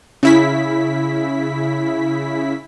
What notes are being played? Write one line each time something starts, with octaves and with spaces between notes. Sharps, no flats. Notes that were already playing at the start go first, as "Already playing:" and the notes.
C#3 E4 B6